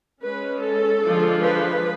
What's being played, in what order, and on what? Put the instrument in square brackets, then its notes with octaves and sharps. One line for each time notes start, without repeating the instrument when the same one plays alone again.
[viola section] G#3 C#4 B4
A4
D3 F3 G#3 D4
B4